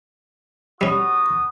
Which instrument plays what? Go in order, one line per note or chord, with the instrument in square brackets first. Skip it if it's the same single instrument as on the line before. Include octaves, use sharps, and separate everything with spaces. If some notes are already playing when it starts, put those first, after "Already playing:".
[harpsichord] G3 C#4 [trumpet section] B3 F#4 D#6